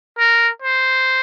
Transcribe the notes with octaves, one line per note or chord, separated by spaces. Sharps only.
A#4
C5